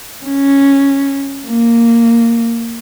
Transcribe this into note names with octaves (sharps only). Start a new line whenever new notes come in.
C#4
A#3